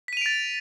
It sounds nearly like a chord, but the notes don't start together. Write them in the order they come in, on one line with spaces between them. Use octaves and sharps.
B6 D#7 F7 D7 A6